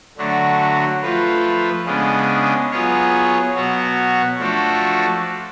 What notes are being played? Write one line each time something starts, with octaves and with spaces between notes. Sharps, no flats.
D3 F#3 A3 D4 F#4
F3 A3 F4 B4
C#3 G#3 B3 D4
F#3 B3 F4 G#4 C#5
B2 F#3 B3 F#4 C#5
F3 A3 D4 F#4 A4